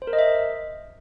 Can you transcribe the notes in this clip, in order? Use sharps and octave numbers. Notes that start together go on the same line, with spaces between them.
C5
A#4
D#5
E5